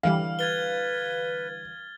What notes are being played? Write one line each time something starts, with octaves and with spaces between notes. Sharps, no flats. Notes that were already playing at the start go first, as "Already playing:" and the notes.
D3 E3 G3 F5 F6
B4 G#6 A6 G7